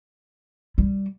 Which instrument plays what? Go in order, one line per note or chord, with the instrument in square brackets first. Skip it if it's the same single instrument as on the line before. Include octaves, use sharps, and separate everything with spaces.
[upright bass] G3